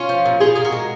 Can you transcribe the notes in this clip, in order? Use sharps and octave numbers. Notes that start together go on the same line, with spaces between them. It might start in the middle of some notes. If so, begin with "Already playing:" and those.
Already playing: C#4 F4
F3
A#2
A#2 F4 G#4
A#2 G#4
F#4 A#4
G#3